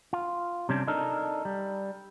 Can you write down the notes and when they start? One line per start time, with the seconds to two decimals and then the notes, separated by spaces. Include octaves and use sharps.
0.13 F4
0.69 C3 G3 C#4 D4
0.87 D4 D#4 A4 A#4
1.45 G3